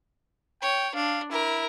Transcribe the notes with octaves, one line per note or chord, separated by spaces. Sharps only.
C#5 G5
D4 F5
E4 A#4